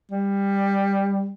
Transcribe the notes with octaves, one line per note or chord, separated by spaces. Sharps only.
G3